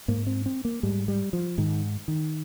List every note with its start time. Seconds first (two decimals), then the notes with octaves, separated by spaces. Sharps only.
0.08 G#2 A#3
0.27 C4
0.46 C4
0.65 A#3
0.83 G#2 G3
1.08 G3
1.33 F3
1.58 G#2 D#3
2.08 D#3